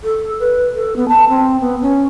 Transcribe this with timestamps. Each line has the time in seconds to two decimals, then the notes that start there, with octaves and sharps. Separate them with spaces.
0.04 A4
0.40 B4
0.75 A4
0.96 B3
1.08 A5
1.29 C4
1.61 B3
1.82 C#4